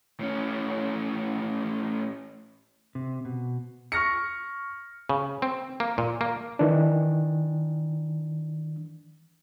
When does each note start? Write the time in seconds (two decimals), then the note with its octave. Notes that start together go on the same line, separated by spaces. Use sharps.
0.20 A2 C#4
2.95 C3
3.25 B2
3.92 C#6 F6 A#6 C#7
5.09 C#3
5.42 C4
5.80 A#3
5.98 A#2
6.21 A#3
6.59 D#3 E3 D4